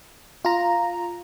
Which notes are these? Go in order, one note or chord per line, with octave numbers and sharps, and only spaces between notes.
F4 A#5